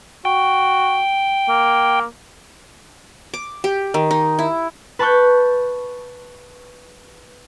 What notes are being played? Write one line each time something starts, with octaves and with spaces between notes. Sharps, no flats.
F#4 G5
A#3
D6
G4
D#3
D#4
E4
B4 A5 B5 C#6 F#6 G6